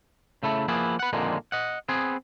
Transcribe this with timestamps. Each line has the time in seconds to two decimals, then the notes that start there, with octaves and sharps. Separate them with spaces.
0.43 C#3 A3 E4 A4
0.68 F3 A#3 B3 E4 G#4
0.99 B4 F#5
1.13 F2 A#2 D3 D#3 G#3 A#3
1.52 D#5 F#5
1.89 B3 C4 G#4